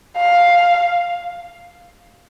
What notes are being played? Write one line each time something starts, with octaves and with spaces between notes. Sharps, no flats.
F5